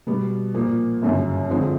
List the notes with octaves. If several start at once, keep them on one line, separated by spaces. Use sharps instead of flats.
B2 G3 B3
A#2 F3 A#3
G1 F#2 C#3
F2 D3 F3 G#3 C4